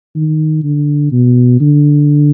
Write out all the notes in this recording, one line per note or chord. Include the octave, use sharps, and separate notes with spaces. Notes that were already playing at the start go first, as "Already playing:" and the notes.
D#3
D3
B2
D3